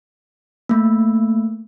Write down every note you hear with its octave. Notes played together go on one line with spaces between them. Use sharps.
A3 A#3